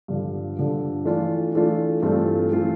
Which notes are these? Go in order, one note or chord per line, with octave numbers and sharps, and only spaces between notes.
G2 D3 F3
G2 D3 F3
E3 A3 D4 F4
E3 A3 D4 F4
G2 E3 A3 C4 F4
E3 A3 C4 F4